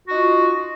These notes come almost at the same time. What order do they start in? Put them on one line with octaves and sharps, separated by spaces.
F#4 D#4 F4